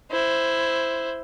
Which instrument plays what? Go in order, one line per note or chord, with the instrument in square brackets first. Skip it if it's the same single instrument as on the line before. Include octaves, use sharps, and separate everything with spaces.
[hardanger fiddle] E4 C5